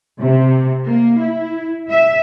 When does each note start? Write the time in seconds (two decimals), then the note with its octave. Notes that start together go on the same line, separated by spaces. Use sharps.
0.21 C3
0.86 A#3
1.20 E4
1.88 E5